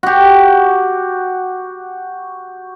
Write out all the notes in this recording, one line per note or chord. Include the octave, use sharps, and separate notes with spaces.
F#4 G4